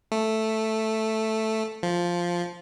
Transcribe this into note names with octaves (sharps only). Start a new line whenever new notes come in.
A3
F3